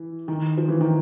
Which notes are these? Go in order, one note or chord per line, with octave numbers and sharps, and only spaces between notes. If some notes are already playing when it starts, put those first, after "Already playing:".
Already playing: E3
D#3
F3
E3
D#3